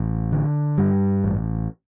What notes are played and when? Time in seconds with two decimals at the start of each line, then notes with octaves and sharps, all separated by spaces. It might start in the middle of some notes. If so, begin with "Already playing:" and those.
Already playing: A1
0.32 D3
0.78 G2 G3
1.24 A1